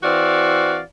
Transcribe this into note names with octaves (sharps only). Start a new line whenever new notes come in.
E3 C4 F#4 D5 F5